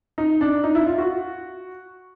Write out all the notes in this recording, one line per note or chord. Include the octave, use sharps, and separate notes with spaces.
D#4
D4
D#4
E4
F4
F#4